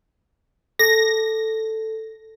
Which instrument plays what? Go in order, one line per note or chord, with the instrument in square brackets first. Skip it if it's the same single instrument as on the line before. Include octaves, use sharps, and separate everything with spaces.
[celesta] A4 [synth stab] A#6